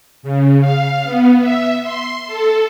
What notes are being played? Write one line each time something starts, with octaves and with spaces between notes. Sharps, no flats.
C#3
F5
B3
E5
C6
A4